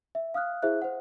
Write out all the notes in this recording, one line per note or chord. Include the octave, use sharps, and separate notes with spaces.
E5
F5 D#6 F6 F#6
E4 G#4 C5 E5 F#6
C5 F#5